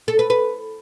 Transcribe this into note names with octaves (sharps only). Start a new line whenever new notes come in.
A4
B4
B4